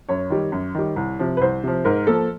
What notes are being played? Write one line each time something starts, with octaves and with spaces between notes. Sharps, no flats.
F#2 C#5
D#3 G3
F#2
D#3 G3
C2
C3 F3
B4
C2 C5
C3 F3
G#2 A#4
F3 A#3 A4